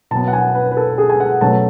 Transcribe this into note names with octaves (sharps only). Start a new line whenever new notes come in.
B2 F#3 B3 A5
F#5
G#5
B4
B4
A4
G#4
G#5
F#5
B2 F#3 A3 C#4 A5